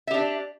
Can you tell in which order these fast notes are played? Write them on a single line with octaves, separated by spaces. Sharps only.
E5 G4 D4